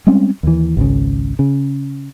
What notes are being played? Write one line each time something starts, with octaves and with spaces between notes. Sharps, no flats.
G3 G#3 C4 C#4
D#2 E3
G#1 C#2 C#3
C#3